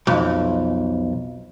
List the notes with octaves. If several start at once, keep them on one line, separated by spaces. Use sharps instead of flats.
B1 F2